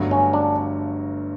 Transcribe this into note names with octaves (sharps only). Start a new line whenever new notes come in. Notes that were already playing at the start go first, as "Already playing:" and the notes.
Already playing: G1 G2 F#3 A3
C#4
D4